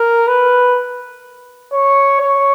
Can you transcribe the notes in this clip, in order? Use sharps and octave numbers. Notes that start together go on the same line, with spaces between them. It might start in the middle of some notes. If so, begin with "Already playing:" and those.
Already playing: A#4
B4
C#5
C#5